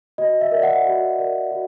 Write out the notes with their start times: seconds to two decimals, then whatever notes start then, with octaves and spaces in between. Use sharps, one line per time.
0.18 F#4 D#5
0.41 E5
0.52 A#4 D5
0.63 F#5
0.85 F#4
1.19 A#4 D5
1.51 F#4